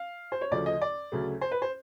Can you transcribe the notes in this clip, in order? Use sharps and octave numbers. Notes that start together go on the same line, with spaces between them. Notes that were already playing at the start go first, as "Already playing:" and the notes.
Already playing: F5
C5
C#5
D2 C#3 F3 A3 D5
D#5
D5
D2 C#3 F#3 A3
C5
B4
C5